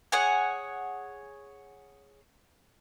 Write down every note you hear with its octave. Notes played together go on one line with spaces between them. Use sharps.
G#4 C#5 F#5 G#5